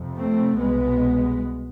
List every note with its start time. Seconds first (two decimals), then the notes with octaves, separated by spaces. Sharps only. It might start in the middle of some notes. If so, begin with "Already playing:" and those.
Already playing: F2 C3
0.16 A3 C4
0.59 C2 B2 G#3 B3